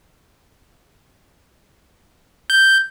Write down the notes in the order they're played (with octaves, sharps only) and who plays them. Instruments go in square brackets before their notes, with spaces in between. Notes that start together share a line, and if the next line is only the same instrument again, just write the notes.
[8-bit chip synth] G6